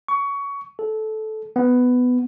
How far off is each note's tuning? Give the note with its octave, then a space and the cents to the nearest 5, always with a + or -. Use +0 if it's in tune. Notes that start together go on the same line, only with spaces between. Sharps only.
C#6 +20
A4 -15
B3 +10